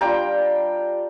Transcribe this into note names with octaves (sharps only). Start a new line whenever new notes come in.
G3 D4 F4 G5 A#5